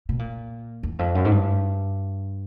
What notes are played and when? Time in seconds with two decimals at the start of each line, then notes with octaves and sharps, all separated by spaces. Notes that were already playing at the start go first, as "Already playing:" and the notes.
0.09 B2
0.19 A#2
0.83 E2
0.99 F2
1.15 F#2
1.25 G#2
1.31 G2